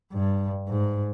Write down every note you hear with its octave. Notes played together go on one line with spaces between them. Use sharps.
G2
G#2